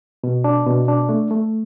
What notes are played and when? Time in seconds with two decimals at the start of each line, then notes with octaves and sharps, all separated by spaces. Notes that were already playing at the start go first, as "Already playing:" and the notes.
0.24 B2
0.44 D4
0.66 B2
0.88 D4
1.09 A3
1.31 A3